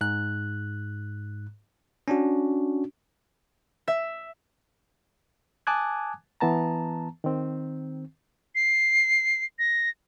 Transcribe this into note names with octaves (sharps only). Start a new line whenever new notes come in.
G#2 F#6
C#4 D4 F#4
E5
G#5 A5 D6 D#6 F#6 G#6
E3 B3 A5 A#5
D#3 C4
C7
A#6